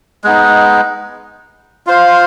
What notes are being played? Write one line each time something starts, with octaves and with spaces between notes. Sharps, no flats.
G#3 B3 D#4
F4 C5 F5